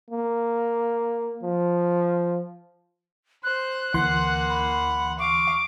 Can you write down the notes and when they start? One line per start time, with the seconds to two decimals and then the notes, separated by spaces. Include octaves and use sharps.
0.11 A#3
1.43 F3
3.44 C5 F#6
3.94 D2 E3 A#3 F#5 C6
4.50 B5
5.19 F5 C#6 D6